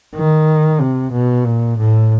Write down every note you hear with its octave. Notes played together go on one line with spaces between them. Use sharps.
D#3
C3
B2
A#2
A2